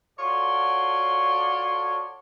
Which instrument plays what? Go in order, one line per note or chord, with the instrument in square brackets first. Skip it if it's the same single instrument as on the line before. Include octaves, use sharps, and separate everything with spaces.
[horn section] F4 F#4 A4 C#5 D5 C6